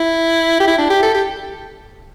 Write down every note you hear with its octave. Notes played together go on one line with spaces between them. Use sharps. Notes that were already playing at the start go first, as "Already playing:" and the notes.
Already playing: E4
G4
E4
D4
G4
A4
G4